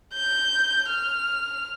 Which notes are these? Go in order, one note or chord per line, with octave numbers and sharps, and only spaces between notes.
G6
F6